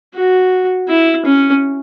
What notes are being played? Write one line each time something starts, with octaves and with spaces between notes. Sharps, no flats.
F#4
E4
C#4